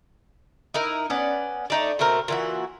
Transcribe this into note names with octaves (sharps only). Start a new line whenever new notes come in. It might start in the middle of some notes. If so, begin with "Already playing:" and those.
D#4 E4 A#4
B3 C#4 D5 F#5
A3 D#4 D5
B2 A3 C4 A#4
A#2 E3 F#4